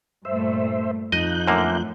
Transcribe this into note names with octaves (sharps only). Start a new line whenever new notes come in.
G2 A#2 A3 C5 E5
F2 F3 D#4 D#5 F#6 G6
F#2 A2 D3 A#3